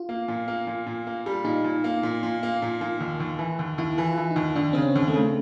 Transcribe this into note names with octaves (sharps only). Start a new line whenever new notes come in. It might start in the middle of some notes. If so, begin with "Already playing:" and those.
Already playing: F4
A#3
A#2
A#3
A#2
A#2
A#3
G3
A#2 D#4
A#2
A#3
A#2
A#2
A#3
A#2
A#2
D#2
D#2
E3
D#2
D#2 E4
E3
F4
E3
D#4
D#2
D#2 D4
C#3 C4
C#4
D#2
A3
C#3